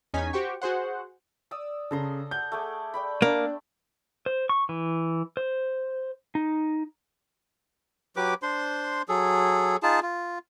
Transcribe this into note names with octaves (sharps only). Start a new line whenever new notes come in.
E2 C#4 D#4 G#5 B6
F#4 G4 C5 G5 C#6
F#4 G#4 C5 F#5
D5 D#6 E6
C#3 A4 A#5 C6
F#5 G6
A3 G#4 D6
D5 G5 B5
A#3 D4
C5
C#6
E3
C5
D#4
F#3 G4 B4 D6
D4 C5 C6
F#3 G#4 A4
D#4 F4 G#4 A5
F4